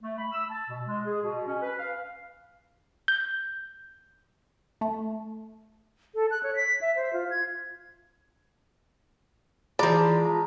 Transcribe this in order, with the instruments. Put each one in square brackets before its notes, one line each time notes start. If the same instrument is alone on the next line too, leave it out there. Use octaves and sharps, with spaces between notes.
[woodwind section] A3
B5
E6
A5
B2
G#3
G#4
B2
C#4
B4
F5
[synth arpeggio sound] G6
[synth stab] A3
[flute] A4
F#6
C#5
B6
E5
C5
F4
G#6
[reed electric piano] E3 A#5 B5 [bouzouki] F3 G#3 [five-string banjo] D5
[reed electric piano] A#5